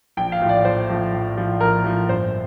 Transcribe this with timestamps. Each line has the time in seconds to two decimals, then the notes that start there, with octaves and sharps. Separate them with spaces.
0.17 A#1 G5
0.32 F5
0.41 A2 F3
0.49 D5
0.65 A#1 C5
0.89 A2 F3
1.12 A#1
1.37 A2 F3
1.60 A#1 A#4
1.84 A2 F3
2.09 G1 C5